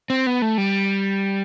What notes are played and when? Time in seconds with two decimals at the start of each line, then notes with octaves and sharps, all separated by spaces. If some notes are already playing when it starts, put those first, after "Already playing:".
0.10 C4
0.27 B3
0.42 A3
0.58 G3